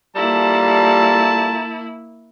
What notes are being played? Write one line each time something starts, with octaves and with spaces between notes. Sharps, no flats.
G3 A#3 E4 F4 A4 A5 A#5